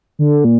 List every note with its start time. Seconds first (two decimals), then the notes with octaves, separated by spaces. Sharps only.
0.19 D3
0.44 A#2